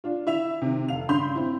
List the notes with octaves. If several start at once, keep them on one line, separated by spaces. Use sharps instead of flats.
D4 F4
E4 E5 F7
C3 D#3
F1 F5 F7
G2 C#3 B5 C6 G6 F7
C4 E4